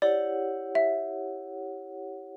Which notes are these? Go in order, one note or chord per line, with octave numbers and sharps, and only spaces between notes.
E4 G4 C#5 D5 F#5
E5